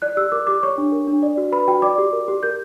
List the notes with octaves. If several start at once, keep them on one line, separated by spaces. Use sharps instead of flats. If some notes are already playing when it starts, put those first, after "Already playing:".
D5 F#6
G4 E6
A#4 D6
G4 D6
C#5 C#6
D4
A#4
D4
D5
F#4
B4 B5
F#4 G5
D5 D6
G4
A#4
G4
A#4 G6